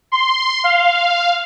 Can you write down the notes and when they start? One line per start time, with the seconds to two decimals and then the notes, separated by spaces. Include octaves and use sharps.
0.12 C6
0.64 F5